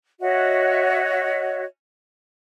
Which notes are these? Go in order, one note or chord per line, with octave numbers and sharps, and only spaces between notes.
F#4 C#5 D#5 E5